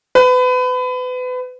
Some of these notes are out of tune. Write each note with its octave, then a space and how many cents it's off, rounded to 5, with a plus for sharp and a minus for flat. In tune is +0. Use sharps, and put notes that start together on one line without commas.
B4 +30